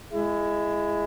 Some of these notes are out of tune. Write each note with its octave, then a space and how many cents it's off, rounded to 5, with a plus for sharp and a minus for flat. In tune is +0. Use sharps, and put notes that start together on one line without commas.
G#3 +0 E4 +25